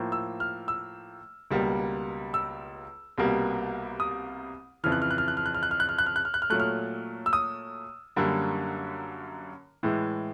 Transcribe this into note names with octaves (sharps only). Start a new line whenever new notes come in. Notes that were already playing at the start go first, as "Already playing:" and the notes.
Already playing: A2 F3 A#3
E6
F6
E6
C#2 B2 G3 A#3
E6
C2 B2 G3 A#3
D#6
F2 C#3 E3 F6
F#6
F6
F#6
F6
F#6
F6
F#6
F6
F#6
F6
F#6
F6
F#6
F6
F#6
F6
F#6
F6
A#2 F#3 A3 F#6
F6
E6
D#6
F#2 D3 G3 A#3
A2 E3 G#3